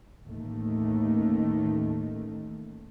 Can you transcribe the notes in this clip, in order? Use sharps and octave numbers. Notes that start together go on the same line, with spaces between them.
A1 D#2 D#3 A3